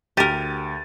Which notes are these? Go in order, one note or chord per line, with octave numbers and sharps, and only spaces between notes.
D2 G4 A#4 A6 D#7